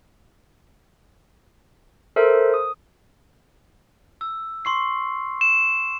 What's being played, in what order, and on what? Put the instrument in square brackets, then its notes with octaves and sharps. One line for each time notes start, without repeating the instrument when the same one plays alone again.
[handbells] A4 A#4 C5 E5
D#6
[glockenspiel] E6
C6 C#6 C7
[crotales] E7